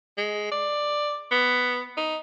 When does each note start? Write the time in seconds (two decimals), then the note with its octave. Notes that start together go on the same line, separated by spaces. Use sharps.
0.18 G#3
0.51 D5
1.31 B3
1.97 D#4